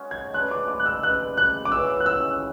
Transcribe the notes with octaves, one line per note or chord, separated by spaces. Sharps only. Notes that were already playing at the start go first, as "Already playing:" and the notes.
Already playing: G#3 C#4 F#4
G#6
G#3 D4 G#4 B4 F#6
D6
D6
F#6
E6
G#3 D4 G#4 B4 F#6
F#6
D6
E3 G#3 C#4 F#4 E6
F#6
E6